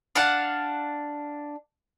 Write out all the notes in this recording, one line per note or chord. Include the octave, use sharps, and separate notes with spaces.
D4 F5 F#5 A5